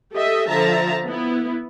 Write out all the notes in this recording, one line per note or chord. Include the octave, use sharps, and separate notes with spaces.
G4 A4 D#5 E5
D3 F3 E5 A5 A#5
B3 E4